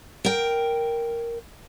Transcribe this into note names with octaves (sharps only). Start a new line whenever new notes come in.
A#4 G5